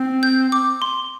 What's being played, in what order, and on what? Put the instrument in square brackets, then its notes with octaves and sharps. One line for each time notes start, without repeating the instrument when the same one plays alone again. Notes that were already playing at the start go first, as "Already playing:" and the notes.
Already playing: [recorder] C4
[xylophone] G6
D6
C6